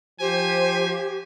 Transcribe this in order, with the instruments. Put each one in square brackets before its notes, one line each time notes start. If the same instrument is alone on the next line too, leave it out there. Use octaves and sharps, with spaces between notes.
[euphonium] F3 [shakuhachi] G4 [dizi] C5 [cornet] G#5